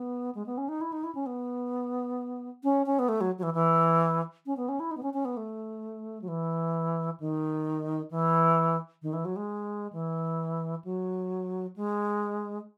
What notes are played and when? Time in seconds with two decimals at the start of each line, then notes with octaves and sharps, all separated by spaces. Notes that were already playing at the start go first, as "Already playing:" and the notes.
Already playing: B3
0.35 G#3
0.46 B3
0.58 C#4
0.69 D#4
0.81 E4
0.92 D#4
1.04 E4
1.15 C#4
1.26 B3
2.64 C#4
2.86 C#4
2.99 B3
3.09 A3
3.21 F#3
3.38 F#3
3.43 E3
3.54 E3
4.46 C#4
4.57 B3
4.69 C#4
4.80 E4
4.91 D#4
4.97 B3
5.03 C#4
5.14 C#4
5.25 B3
5.37 A3
6.22 F#3
6.28 E3
7.20 D#3
8.11 E3
9.02 D#3
9.13 E3
9.25 F#3
9.36 G#3
9.93 E3
10.84 F#3
11.76 G#3